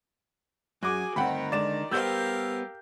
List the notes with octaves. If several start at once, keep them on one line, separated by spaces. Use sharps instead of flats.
F#2 F#4 G#4 G#5 D6
D2 G2 D#3 C4 D#4 F#5 G5 B5
D3 G#3 D5 E7
G3 B3 G4 A#4 C5 F5 E6 G6